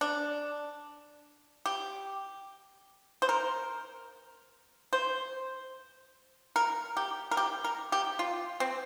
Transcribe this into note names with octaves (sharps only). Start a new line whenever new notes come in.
D4
G4
C5
A#4
C5
A#4
G4
A#4
G4
A#4
G4
F4
C4